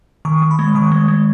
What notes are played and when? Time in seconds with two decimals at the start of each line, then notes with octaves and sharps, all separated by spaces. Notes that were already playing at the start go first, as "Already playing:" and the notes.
0.25 D#3 C#6
0.42 D#3
0.51 B5
0.59 G#3
0.75 D#3 C#6
0.92 G#3
1.08 G#3